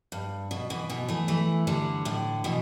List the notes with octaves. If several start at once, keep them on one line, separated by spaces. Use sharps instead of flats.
G2
B2
B2 E3
B2 E3
E3 A3
E3 A3
D3 G3
A2 D3
B2 E3